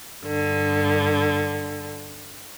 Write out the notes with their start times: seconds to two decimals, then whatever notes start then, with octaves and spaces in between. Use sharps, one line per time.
0.24 G2 D3